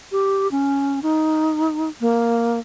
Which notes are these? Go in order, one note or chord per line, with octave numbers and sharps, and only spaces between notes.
G4
C#4
D#4
A#3